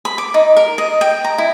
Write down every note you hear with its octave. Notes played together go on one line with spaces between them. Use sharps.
B5
D6
D#4
A#4
D#5
G5
A#5
E4